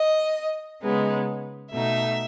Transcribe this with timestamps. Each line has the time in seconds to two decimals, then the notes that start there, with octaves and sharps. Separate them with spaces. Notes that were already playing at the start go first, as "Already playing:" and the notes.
Already playing: D#5
0.81 C#3 G#3 B3 D#4
1.71 B2 A3 D#4 E5